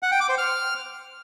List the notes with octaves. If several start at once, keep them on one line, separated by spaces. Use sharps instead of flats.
F#5
G5
D6
C5
F6